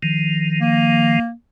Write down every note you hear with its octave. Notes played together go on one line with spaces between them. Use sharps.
D#3 F3
A#3